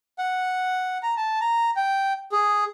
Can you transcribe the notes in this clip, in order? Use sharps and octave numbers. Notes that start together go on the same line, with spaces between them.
F#5
A#5
A5
A#5
G5
G#4